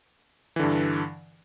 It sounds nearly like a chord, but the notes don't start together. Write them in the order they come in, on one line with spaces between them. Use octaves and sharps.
E3 D3 G2